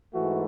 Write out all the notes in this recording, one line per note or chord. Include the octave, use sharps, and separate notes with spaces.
G#2 E3 A3 F#4